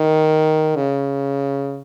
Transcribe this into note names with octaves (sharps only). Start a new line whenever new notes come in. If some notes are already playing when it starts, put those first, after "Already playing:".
Already playing: D#3
C#3